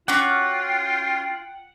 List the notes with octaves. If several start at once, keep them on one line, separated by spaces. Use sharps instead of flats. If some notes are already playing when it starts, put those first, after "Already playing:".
C#4 F4 F#4 F#5 G5 D6